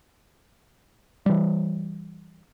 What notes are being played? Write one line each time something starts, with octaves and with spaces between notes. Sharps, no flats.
E3 G3